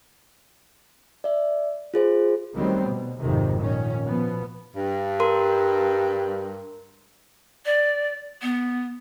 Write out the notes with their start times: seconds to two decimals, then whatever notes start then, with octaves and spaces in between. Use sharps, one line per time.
1.24 D5 E5
1.94 F4 G#4 C5
2.56 D2 D#3 F#3 G3 B3 C4
2.88 B2
3.20 G#1 F2 C3 D#3
3.58 A#2 D#3 C#4
4.07 B2 F3 B3
4.75 G2
5.20 A#4 C6
7.66 D5
8.42 B3